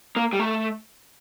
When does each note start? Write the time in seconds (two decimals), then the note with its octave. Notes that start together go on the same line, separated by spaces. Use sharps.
0.16 A#3
0.33 G3
0.39 A3